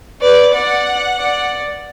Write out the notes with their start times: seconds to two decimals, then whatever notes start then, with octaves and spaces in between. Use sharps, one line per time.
0.21 B4 D5
0.53 D5 F#5
1.18 D5